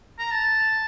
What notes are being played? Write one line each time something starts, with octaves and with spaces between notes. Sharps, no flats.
A#5
A5